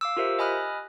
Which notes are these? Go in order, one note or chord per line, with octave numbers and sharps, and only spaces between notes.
F5 D6 E6
F4 G4 A#4 C5 E5
D#5 G#5 B5 D#6 F6 F#6